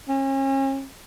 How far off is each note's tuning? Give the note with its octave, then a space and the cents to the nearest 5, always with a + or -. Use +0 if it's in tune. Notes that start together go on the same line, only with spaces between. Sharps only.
C#4 -40